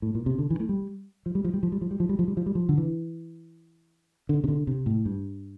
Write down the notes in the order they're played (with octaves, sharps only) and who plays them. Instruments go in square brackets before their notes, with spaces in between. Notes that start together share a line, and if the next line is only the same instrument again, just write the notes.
[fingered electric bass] A2
A#2
C3
D3
E3
A3
G3
F3
G3
F3
G3
F3
G3
F3
G3
F3
G3
F3
G3
F3
G3
F3
D3
E3
D3
C3
D3
C3
A2
G2